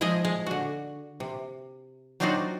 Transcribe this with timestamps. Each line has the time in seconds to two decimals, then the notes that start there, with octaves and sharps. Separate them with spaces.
0.01 F3 G#3 G#4 D#5 E5
0.25 G#3
0.46 D3 F#4
1.20 C3
2.20 F#3 C4 D4 D#4 F4 F#4